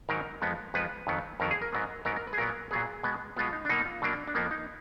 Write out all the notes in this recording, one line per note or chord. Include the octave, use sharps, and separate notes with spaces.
G#2 D#3 F#3 A#4
F2 F3 G#3 B3
F2 F3 G#3 B3 B4
F2 D#3 F#3 B3
F2 D#3 F#3 B3 A#4
G#4
A#4
G#2 F#3 B3
G#2 F#3 B3 A#4
A#4
B4
G#4
A#2 F#3 B3 A#4
A#2 F#3 B3 G#4
B2 G#3 B3
B2 G#3 B3 F4
D#4
D4
B2 F#3 A#3 D#4
F4
B2 F#3 A#3 D4
D4
F2 F3 A#3 B3
D#4